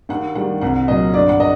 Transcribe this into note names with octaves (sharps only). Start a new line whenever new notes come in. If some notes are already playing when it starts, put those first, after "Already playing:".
D#2 F#5
D#3 G3 F#5
C2 F#5
A#2 F#3 D#5
G1 D5
F#5
D#5